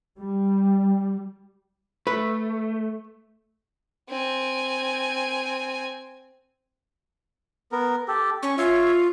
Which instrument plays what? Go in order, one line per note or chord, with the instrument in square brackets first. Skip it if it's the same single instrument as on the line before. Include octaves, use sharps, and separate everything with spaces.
[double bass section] G3
[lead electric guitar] A3 [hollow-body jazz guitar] B4
[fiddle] C4 G#5
[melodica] B3 A#4
G4 A4
[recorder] C#4 [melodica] C#6
[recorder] F4 [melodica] C#5 E5